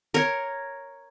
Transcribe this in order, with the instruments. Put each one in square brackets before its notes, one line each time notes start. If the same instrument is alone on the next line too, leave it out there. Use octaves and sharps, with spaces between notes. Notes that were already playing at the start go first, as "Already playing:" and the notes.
[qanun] A#4 C#5